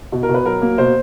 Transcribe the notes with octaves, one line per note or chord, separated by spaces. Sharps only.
B2
A#4
B2
B4
F#3 A#4
A#3
B2 C5